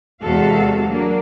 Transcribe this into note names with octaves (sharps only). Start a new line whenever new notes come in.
E2 C3 G#3 F#4 A4 F5
F#3 A#3 D4